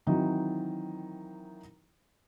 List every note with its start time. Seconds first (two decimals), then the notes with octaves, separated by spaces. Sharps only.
0.07 D#3 E3 F#3 C4 D#4